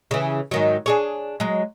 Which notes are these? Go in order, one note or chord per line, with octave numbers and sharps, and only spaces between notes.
C#3 E3
G#2 D#3 F#3
D4 G#4 C#5
F#3 G#3